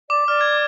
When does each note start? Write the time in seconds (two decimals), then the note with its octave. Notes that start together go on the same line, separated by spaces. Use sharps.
0.10 D5 D6
0.28 D5 F6
0.41 G#6